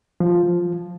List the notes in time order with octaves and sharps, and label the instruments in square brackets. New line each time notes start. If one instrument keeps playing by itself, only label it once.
[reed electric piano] F3